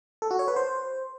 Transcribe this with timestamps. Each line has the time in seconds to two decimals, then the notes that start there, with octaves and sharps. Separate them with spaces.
0.22 A4
0.31 F#4
0.39 C#5
0.48 B4
0.56 C5